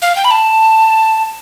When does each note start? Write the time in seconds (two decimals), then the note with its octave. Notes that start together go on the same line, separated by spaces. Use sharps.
0.02 F5
0.16 G5
0.25 B5
0.31 A5